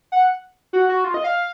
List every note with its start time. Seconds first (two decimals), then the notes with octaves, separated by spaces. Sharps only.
0.12 F#5
0.73 F#4
0.89 F#4
1.04 F4
1.14 D#5
1.24 F5